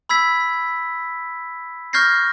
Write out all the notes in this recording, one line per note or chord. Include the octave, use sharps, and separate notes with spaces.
B5 E6 G#6 B6
C#6 F6 G6 G#6 A#6 C7